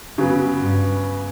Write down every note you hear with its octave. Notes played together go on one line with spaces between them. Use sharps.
F#2 C#3 F#3 B3
G2